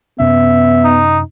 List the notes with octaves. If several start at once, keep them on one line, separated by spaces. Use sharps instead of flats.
F#2 C3 B3 C#4 E5
D#4